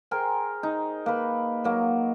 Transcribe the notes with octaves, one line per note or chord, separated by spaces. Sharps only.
G#4 A#4 C5 G5
D#4
A#3 B4
F#3 A#3